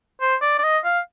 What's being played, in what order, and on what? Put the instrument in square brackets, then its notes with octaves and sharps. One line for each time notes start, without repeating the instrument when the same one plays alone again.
[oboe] C5
D5
D5
D#5
F5